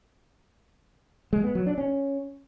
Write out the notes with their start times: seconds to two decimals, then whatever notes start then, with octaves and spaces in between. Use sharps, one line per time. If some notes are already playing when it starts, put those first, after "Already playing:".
1.33 G#3
1.44 B3
1.55 F#3
1.66 D4
1.78 C#4